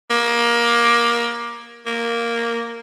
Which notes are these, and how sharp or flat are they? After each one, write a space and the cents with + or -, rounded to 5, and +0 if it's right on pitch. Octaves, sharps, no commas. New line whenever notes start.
A#3 +20
A#3 +0